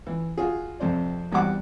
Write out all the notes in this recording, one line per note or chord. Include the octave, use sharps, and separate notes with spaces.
E3
F4 F#4 G#4
F2 C3 C5 D5
E2 G3 C4 F#4 F#5 D6